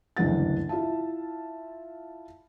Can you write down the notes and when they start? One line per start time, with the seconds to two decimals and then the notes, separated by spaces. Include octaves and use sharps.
0.17 F#1 D2 G2 E3 F#5 A6
0.69 E4 F4 E5 A5